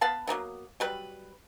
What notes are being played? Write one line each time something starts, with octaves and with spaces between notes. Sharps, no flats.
B3 F5 A5 B5
F#3 G3 A#3 B3
F#3 G3 B4